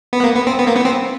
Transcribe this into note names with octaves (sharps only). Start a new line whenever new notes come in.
B3
A#3
B3
C4
B3
A#3
B3
C4